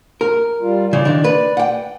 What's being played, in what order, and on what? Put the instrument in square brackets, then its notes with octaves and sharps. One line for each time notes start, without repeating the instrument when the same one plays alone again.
[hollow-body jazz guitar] A#4
[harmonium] G3 F4
[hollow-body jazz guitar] C#3 E3 [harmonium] D5
[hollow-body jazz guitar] D#3 D4
B4
F#5 G5